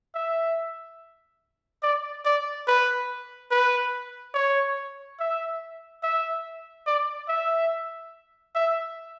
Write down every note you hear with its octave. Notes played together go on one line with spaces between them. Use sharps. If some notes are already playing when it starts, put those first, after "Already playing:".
E5
D5
D5
B4
B4
C#5
E5
E5
D5
E5
E5